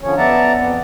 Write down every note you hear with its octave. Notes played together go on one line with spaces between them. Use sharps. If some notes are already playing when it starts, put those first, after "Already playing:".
D3 F3 C#4 C#5
B3 D5 E5 F#5 A5 A#5
F2 B3